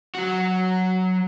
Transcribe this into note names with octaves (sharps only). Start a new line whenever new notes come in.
F#3 F#4